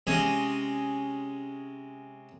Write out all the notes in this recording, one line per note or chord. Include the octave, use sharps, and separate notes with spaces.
C3 G#3 C#4 D#5 G#5